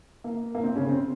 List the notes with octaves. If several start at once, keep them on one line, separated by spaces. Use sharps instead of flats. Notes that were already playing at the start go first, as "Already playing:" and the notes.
A#3
A#3
C4
C#3 C#4
C4